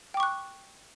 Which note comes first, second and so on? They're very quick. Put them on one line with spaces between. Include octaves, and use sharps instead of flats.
G5 D6 C#6 F#6